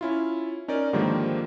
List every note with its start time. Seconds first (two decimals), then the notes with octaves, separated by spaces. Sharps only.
0.01 C#4 E4 F4
0.68 C#4 D#4 A#4 D5
0.93 G#2 D3 D#3 F3 G3 A#3